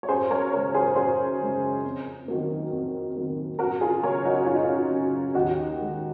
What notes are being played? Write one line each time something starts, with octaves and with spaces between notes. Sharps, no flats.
C#5
F#2 G#4 C5
A#4 C#5
C#3 G#3 A#4 C#5
G#4 C5
F#2 G#4 C5
C#3 G#3
F2
D#3 F#3 A#3
F2
D#3 F#3 A#3
F#2 F#4 A#4
F4 G#4
C#3 F#3 A#4 C#5
D#4 F#4
F#2 F4
D#4
C#4 F4
C#3 F#3
D#2 D#4 F#4
D#3 G#3